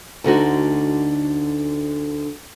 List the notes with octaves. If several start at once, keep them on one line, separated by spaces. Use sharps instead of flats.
D2 D3 D#4 F#4